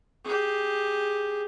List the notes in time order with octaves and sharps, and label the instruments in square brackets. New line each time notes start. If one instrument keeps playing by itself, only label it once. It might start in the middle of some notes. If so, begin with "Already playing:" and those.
[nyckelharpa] G4 G#4